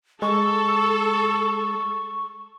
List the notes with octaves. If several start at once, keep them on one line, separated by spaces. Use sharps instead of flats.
G#3 A4 C#6